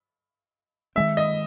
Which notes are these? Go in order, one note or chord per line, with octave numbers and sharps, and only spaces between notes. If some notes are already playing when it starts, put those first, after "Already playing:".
D#3 G#3 C4 E5
D#5